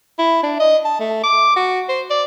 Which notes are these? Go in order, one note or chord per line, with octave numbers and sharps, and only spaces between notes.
E4
D4
D#5
A5
A3
D6
F#4
C5
D5